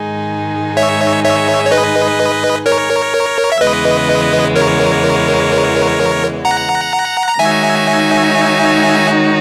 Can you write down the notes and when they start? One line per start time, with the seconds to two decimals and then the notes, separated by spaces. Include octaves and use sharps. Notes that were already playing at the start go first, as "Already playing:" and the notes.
Already playing: G#2 D#3 G#3 D#4 G#4
0.77 C#5 E5
1.24 C#5 E5
1.65 C#5
1.71 B4 D#5
2.66 A#4 C#5
3.52 E5
3.61 E2 C#3 E3 G#3 B3 B4 D#5
4.56 A#4 C#5
6.45 F#5 A#5
7.28 A#5
7.39 D#3 G#3 D#4 F#4 C#5 E5 G#5